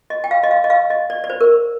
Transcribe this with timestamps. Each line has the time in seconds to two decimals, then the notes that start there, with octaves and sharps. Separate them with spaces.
0.10 D#5
0.24 G5
0.31 F5
0.43 D#5
0.51 F5
0.64 D#5
0.70 F5
0.90 D#5
1.10 D5
1.24 D5
1.30 C5
1.41 A#4